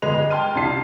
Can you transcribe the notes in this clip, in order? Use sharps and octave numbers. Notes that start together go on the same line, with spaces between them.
G1 G#3 B4 D#5 F7
G5 A5 C6 F6 D#7
C2 D4 E4 A5 C7